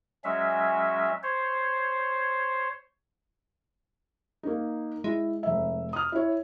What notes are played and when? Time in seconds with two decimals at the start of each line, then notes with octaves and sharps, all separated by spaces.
0.24 F#3 G#3 C#4 E5
1.23 C5 C#5
4.43 A#3 D#4
5.04 G#3 E4
5.43 F1 E5
5.93 D#6 F6
6.12 E4 C#5